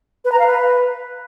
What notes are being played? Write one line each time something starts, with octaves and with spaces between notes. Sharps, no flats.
B4
A#5
F5
B4